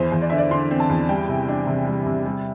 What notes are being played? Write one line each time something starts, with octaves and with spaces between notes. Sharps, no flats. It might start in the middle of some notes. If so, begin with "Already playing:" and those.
Already playing: E2 C5
E2
D5
D3 E5
D5
D3 C6
C4
A5
E2
G3 G5
C3
D4
C3
G3
C3
G3